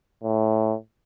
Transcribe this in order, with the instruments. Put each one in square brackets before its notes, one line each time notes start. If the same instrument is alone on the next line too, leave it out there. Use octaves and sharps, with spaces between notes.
[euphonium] A2